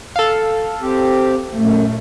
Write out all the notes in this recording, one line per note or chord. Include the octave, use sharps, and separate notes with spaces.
A4 F5
C4 G4
F#2 A#2 A3